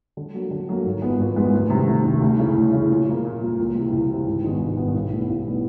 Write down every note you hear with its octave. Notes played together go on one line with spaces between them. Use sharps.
D3
F#3 A#3
D3
F#3 A#3
G#1
G#2 F3 G#3 B3
G#1
G#2 F3 G#3 B3
D2
C3 D#3
D2
C3 D#3
D2
C#3 E3
D2
C#3 E3
A#2
F3 A#3
A#2
F3 A#3
C#2
C3 E3
C#2
C3 E3
G#1
G2 D#3 G#3 B3
G#1
G2 D#3 G#3 B3
B1
A2 E3 G3 B3
B1
A2 E3 G3 B3